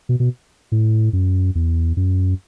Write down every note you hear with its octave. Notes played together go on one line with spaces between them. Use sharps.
B2
B2
A2
F#2
E2
F#2